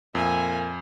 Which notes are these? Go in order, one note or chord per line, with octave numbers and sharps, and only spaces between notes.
F2 A#2 E5 G#5